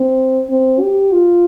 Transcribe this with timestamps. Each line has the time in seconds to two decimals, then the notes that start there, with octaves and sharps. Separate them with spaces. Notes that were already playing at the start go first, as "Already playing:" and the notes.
Already playing: C4
0.50 C4
0.81 G4
1.12 F4